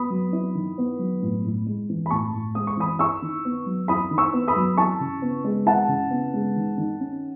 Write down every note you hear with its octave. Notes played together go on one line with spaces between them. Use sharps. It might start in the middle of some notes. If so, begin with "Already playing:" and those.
Already playing: B3 B5 D#6
F#3
E4
D#3
B3
F#3
A2
A2
G#3
E3
B5
A2 A5 C#6
A2
G#3 D#6
C#6
E3 B5 D#6
E4 C#6 E6
D#3
B3
F#3
E4 B5 D#6
D#3
C#6 E6
B3
B5 D#6
F#3
E4 A5 C#6
C#3
B3
G#3
E4 F#5 A5
C#3
B3
G#3
D#3
D#3
C#4